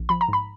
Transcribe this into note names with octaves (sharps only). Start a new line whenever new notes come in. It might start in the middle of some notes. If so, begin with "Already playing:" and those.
Already playing: A#1
F3 B5
A#5
G#2 B5